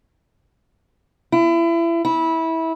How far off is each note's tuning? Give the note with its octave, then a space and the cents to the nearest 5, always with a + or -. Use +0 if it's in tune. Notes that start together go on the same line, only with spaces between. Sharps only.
E4 +30
E4 -20